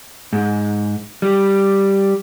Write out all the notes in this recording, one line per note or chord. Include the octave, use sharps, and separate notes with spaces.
G#2
G3